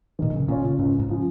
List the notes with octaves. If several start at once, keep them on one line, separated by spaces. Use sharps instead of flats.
A#2 D#3
C#3
A#2 C#4 F4 C#5
C#3
C#2 G#2
G#2
C#3 F3